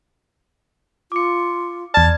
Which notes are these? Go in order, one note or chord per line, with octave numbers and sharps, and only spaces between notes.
F4 D6 C#7
E2 D5 A5 F6 G#6